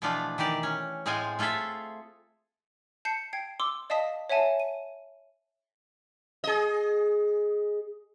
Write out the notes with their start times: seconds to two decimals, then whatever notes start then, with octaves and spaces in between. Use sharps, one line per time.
0.02 B2 E3 F3 A3 D4 F4
0.38 D#3 E3 G4 D5
0.63 C#4
1.06 A2 G#3 C4 F4 G#5
1.39 A3 F4 G#4 A4 E5
3.05 A5 G6 C7 C#7
3.33 G5 G#6 C7
3.60 C6 D6 E6
3.90 D5 D#5 F5 A5 D#6 B6
4.30 C#5 E5 F#5 G#5 A5
4.60 D#7
6.44 G#4 D#5